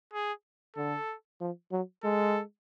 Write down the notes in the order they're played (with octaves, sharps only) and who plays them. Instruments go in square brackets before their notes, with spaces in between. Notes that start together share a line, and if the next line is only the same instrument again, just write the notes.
[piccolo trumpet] G#4
[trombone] D3 [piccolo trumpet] A4
[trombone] F3
F#3
[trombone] G#3 [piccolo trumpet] A4